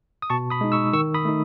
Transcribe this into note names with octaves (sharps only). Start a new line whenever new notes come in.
D#6
B2 A5 C#6
B5 D#6
G#3 D#4
C#6 E6
D#3 C#6 E6
B5 D#6
A3 D#4